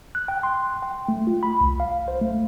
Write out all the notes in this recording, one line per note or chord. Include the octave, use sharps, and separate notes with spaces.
F#6
G5
C6
G5
A3
F4
B5
C2
F5
C5
A3